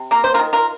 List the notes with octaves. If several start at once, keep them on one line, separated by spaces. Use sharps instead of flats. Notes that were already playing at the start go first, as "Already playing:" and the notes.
Already playing: C3
A#3 A#4
C5
F4 A#4
D#3
F4 A#4